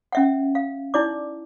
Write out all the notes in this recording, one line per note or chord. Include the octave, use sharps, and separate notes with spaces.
C#4 E5 F#5
F5
D#4 E4 D5 D6